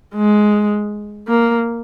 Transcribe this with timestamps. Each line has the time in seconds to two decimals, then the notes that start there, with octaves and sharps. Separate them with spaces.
0.15 G#3
1.28 A#3